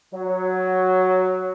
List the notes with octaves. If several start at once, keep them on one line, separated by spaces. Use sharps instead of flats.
F#3